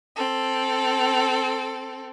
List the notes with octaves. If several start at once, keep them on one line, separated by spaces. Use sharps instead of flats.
C4 A4